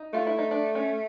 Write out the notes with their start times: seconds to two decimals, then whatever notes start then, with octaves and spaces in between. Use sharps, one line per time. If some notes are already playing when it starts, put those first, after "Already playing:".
Already playing: D#4
0.13 A3 F4
0.27 E4
0.38 D#4
0.51 D4
0.75 C#4